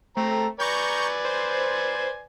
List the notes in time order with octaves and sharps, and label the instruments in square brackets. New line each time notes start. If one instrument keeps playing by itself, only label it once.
[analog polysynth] A3 [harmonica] C4 A#5
[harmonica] B4 D5 G#5 [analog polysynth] A#5 C#6 G6
[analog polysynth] C5